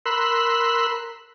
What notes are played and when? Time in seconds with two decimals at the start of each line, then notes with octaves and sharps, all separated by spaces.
0.06 A#4 B5 C6 E6 F#6